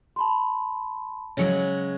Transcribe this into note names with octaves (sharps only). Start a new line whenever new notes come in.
A5 B5 C6
C#3 F#3 G#3 C#5